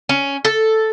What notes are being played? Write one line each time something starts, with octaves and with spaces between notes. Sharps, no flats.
C#4
A4